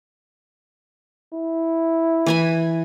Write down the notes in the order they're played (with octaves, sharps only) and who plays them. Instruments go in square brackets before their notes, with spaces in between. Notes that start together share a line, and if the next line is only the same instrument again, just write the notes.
[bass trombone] E4
[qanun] E3 G#5 B5